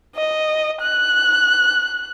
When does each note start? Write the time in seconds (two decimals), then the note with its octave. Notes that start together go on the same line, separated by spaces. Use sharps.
0.16 D#5
0.82 F#6